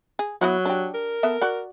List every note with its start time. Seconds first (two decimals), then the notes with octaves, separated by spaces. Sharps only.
0.19 G#4
0.41 F#3 B3 E4 F#4
0.66 D4 G4
0.94 A#4
1.23 B3 A4 E5
1.42 F#4 D5 F#5